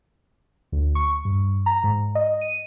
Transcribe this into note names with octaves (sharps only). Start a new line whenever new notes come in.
D2
C#6
G2
A#5
G#2
D#5
D#7